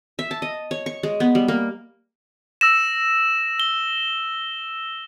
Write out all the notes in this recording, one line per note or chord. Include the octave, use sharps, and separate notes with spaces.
E5
A5
D#5
C#5
C#6
G#3
B3
G3
A#3
E6 A#6 E7
G7